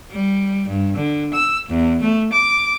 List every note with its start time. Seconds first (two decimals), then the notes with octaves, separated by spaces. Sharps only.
0.11 G3
0.68 G2
0.97 D3
1.33 E6
1.69 E2
2.01 A3
2.33 D6